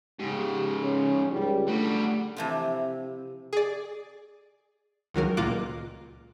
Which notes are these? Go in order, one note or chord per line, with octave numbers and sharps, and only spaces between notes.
G#2 C#3 G4
C#4
C#2 G3
D3 G3 A3 F#4
C3 E3 F3
G#4 D5
C#2 D#3 F#3 A#4
C#2 A#2 A#3 F4 D6 F#6